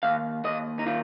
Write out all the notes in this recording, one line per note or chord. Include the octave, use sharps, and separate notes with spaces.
D#2 F5
D#2 D#5
D#4
D#3 F4